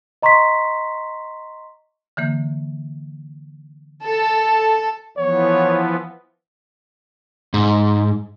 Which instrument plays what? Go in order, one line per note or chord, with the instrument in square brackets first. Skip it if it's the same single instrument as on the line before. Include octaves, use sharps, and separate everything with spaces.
[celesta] D#5 A#5 C6 C#6 B6
[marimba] D3 E3 A#3
[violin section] A4
[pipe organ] E3 F3 B3 [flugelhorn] C#5
[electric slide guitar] G#2